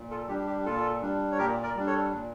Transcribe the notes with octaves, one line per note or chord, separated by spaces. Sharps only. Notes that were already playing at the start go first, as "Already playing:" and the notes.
Already playing: A#2
F4 A4
G3 D4 G4
G4
A#2 F4 A4
G3 D4
C#5
A#2 G4 A#4
A#4 D5
G3 D4
A4 C#5
A#2